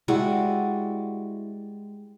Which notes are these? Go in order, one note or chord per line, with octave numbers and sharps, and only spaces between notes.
G3 G#3 E4 F#4